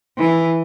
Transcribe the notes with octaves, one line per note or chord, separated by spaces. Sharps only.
E3